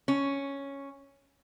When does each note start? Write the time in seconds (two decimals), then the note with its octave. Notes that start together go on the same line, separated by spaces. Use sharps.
0.08 C#4